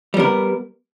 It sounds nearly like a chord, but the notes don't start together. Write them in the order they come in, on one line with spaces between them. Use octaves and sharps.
G3 B3 A#4